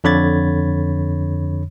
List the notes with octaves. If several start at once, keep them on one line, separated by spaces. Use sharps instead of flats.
F2 D3 C#5 B5 G#6 A6